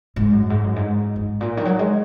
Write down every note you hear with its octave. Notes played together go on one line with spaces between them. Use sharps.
G#2
F#2
G#2
F#2
G#2
G#2
A#2
D#3
F#3
G#3